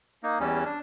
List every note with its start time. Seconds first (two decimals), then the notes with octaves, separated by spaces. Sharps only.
0.23 A#3 D#4
0.40 E2 G3 C#4
0.65 D4